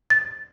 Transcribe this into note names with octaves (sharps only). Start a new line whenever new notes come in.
A6